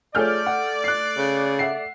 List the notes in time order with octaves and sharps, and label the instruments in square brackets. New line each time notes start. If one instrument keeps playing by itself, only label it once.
[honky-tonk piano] A3 F6 G6 [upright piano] F4 G#4 C#5 [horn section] D5
[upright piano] F#5
F#6 C7
[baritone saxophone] C#3
[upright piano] E5 F#5 C7